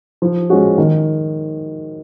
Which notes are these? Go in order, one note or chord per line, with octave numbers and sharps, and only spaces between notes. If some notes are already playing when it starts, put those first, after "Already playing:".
F3
G#3 C#4 F#4
D#3